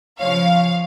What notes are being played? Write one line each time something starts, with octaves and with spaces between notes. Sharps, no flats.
C#3 F3 C#5 F5